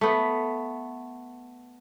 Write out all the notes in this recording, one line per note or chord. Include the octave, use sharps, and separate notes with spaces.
A3 B3